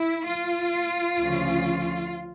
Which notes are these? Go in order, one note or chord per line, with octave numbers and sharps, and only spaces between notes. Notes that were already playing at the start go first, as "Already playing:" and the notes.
Already playing: E4
F4
D2 C#3 F3 C#4